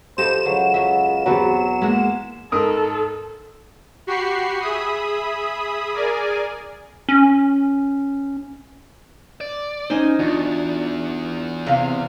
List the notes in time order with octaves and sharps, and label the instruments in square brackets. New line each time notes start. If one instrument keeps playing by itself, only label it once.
[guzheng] F3 G3 D#5 [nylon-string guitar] G4 A4 [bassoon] C5 [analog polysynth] E7
[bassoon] C#2 [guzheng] F#3
[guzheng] F#3 E5
[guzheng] E2 A4 B4 [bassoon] F#3 [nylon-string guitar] C4 F#4 G4
[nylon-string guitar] G#3 A#3 [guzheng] E5 F#5 A#5
[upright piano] G#2 A#4 D#6 [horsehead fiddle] A4
[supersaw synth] F#4 G4 B5 C#6 C7
G#4 E5 B5 D#6
G#4 A#4 D5 G#5
[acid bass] C#4
[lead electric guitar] D5
[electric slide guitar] C#4 C5 [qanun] D#4 G#5
[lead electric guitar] E2 [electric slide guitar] D4 F4 F#4
[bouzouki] C3 F5